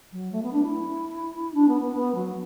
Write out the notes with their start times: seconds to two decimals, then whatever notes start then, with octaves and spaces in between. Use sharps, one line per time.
0.12 F#3
0.32 A3
0.43 B3
0.53 D4
0.63 E4
1.54 D4
1.68 B3
1.81 B3
1.95 B3
2.15 F#3